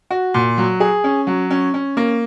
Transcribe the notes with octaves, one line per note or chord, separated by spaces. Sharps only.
F#4
A#2
F#3
G#4
C#4
F#3
C#4
C#4
A#3